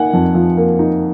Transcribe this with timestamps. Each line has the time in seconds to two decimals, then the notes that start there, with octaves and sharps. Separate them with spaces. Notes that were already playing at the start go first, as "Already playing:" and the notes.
Already playing: A#3 D#4 F#5 G#5
0.13 F2
0.35 F3
0.57 A#3
0.79 D#4